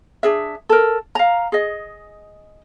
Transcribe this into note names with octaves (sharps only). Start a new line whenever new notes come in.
D4 G#4 E5
A4 A#4
F5 A#5
G#4 D#5